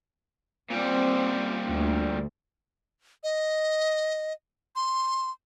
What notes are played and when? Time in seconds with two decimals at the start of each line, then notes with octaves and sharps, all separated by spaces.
0.70 A#2 G3 C4
1.70 D2
3.24 D#5
4.76 C6